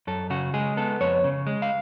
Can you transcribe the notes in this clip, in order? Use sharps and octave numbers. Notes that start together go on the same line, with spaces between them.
F#2 A4
C#3 F#4
G#3 G#4
B3 A4
F2 C#5
C#3
G#3
F5